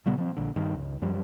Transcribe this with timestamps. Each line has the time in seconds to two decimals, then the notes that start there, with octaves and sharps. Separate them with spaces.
0.06 A#2 C#3 G3 B3
0.18 F3 C4
0.37 A#1 D3
0.56 G2 D#3
0.74 C#2
1.02 F#2 F3 G3